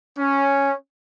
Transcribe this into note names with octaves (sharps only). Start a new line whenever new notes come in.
C#4